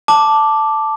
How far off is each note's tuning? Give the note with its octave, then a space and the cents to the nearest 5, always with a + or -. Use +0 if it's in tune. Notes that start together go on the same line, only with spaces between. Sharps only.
A5 +0 D6 +0